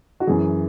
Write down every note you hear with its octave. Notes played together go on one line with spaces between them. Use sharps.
F#4
F#2 E3 G#4